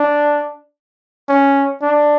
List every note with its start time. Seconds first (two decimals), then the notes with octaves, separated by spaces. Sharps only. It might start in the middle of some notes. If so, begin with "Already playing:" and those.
Already playing: D4
1.29 C#4
1.82 D4